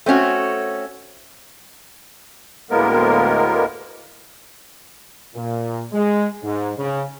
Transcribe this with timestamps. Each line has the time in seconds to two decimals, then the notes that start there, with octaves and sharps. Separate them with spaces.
0.06 A3 C4 C#4 F#4
2.70 D2 A2 G#3 A#3 B3 A#4
5.35 A#2
5.93 G#3
6.43 G#2
6.78 C#3